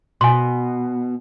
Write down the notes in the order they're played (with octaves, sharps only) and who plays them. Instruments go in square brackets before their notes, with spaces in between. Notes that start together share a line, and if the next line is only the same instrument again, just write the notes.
[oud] B2 [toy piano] G#5 C6